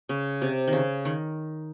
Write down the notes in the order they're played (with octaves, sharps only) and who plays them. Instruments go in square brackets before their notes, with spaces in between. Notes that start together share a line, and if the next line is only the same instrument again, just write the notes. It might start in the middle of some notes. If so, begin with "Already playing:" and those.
[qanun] C#3
C3
D#3
C#3
D#3